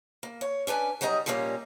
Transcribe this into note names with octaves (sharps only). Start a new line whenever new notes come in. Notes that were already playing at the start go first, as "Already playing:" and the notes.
A#3
C#5
C#4 D4 B4 G#5
F#3 G3 D#4 D#5 A#5
A#2 F3 G3 A#3 C#4